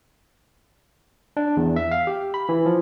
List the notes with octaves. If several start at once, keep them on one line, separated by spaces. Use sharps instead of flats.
D4
E2
E5
F5
G4
B5
E3
F3